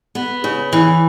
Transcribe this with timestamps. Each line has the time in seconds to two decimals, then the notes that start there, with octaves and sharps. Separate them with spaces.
0.15 B3
0.44 C#3
0.73 E3